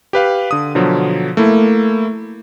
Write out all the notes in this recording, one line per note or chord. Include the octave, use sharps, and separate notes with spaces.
G4 B4 F5
D3 D#6
B2 D3 F3 F#3
A3 A#3 E4